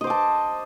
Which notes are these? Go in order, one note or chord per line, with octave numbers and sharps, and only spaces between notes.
C5 D#5 A5 D6